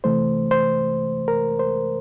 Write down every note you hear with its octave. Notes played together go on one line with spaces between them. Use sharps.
C3 E3 A3 C5
C5
A#4
C5